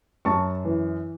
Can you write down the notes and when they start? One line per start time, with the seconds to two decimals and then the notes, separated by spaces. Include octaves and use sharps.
0.25 F#2 A5 C#6
0.65 E3